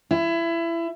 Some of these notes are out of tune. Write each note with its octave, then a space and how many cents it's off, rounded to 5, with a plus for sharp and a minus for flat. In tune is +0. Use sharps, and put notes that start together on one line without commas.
E4 +25